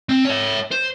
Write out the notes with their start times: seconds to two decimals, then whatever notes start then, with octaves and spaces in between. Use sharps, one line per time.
0.09 C4
0.25 C#5 E5
0.72 C5